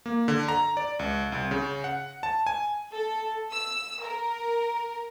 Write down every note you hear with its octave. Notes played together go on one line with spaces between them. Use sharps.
A#3
D3
A#5
D5
C#2
C2
C#3
F#5
A5
G#5
A4
E6
A#4